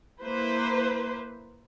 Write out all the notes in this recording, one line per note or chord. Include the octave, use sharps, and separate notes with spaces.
A#3 E4 B4 C5